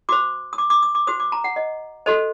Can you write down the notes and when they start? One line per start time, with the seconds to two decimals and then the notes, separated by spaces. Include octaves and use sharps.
0.09 F#4 C5 D6
0.53 D#6
0.58 D6
0.70 D6
0.83 D#6
0.95 D6
1.07 F#4 C5 D#6
1.20 D6
1.32 A#5
1.44 F#5
1.56 D#5
2.06 F#4 A4 C5 D#5